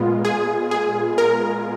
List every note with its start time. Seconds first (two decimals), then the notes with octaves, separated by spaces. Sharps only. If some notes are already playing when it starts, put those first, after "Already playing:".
Already playing: A#2 G#3 B3 F4
0.25 G#4
0.71 G#4
1.18 A#4